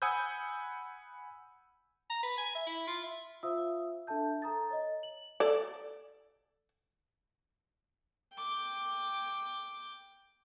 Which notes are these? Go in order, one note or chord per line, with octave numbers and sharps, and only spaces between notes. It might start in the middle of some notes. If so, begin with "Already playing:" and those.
F#5 G#5 B5 D#6 E6 G6
A#5
B4
G#5
E5
E4
F4
E5
F4 C5 E5 F5 D#6 E6
D4 A4 E5 A5 G6
A4 A#5 D#6 A6
C#5 D#5
F#7
A4 D5
G5 D6